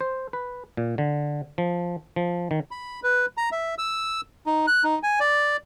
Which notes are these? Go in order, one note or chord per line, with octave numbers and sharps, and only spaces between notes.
C5
B4
A#2
D3
F3
F3
D#3
B5
B4
A#5
E5
E6
D#4
F#6
D#4
G#5
D5